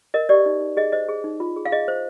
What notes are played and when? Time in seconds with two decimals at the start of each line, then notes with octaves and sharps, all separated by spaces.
0.14 A#4 D#5
0.29 G4 D5
0.46 D#4
0.61 D#4
0.77 G#4 D#5
0.92 C5 D#5
1.09 G#4
1.24 D#4
1.40 F4
1.56 G#4
1.65 F5
1.72 G#4 D#5
1.88 C5